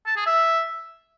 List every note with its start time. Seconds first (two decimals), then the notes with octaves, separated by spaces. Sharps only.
0.06 A5
0.16 G#4
0.26 E5